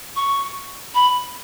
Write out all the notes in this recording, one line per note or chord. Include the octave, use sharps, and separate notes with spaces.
C#6
B5